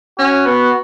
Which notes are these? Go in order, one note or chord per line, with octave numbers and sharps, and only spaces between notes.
C#4 F#4
B3